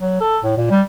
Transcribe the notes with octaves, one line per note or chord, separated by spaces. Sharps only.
F#3
A4
A2
A#2
G3